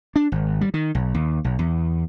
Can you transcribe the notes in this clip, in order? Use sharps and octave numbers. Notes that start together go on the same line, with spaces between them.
D4
G#1
G3
D#3
B1
D#2
B1
E2